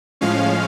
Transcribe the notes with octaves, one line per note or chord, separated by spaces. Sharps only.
A2 F3 G#3 C#4 F5